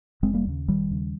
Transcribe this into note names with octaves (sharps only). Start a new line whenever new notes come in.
F1 G#3 C4
G3 A#3
D#2 C#3
F1 D#3 G3
D#2 C#3